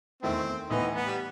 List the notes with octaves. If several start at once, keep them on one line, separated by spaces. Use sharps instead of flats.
E2 D#3 A3 C4 E4
A2 E3 B3 D#4
B3
G3